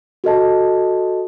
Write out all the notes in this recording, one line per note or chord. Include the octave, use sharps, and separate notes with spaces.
F#4 A4 D#5 A5